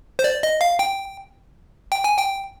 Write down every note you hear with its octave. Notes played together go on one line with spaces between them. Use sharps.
C5
D5
D#5
F5
G5
G5
G#5
G5